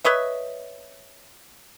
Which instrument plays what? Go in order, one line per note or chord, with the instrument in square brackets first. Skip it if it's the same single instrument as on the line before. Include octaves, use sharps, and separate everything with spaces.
[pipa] B4 C#5 D#5 E5